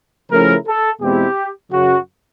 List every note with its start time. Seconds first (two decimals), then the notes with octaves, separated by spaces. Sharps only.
0.31 C#3 F3 A3 C#4 E4 A#4
0.67 A4
1.01 E2 B2 G#3 C4 E4 G4
1.72 F#2 C#3 F#3 F#4